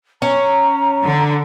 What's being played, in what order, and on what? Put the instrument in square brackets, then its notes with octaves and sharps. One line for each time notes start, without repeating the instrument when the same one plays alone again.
[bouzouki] C#4 [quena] A#5
[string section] D3